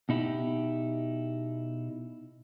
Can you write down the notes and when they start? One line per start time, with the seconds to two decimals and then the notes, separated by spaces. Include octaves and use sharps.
0.09 B2 D#4 E4 G4